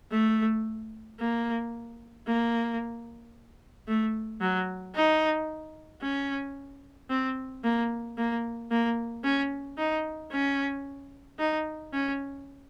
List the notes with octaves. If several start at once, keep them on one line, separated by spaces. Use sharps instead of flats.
A3
A#3
A#3
A3
F#3
D#4
C#4
C4
A#3
A#3
A#3
C#4
D#4
C#4
D#4
C#4